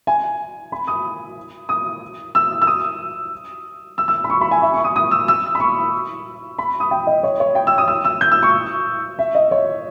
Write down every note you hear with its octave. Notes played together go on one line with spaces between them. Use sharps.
G#5
B5
D#6
D#6
E6
E6
D#6
E6
E6
B5
C#6
B5
G#5
E5
C#6
D#6
D#6
E6
E6
B5
C#6
B5
D#6
G5
D#5
C#5
C#5
G5
E6
D#6
E6
E6
G6
E6
C#6
E5
D#5
C#5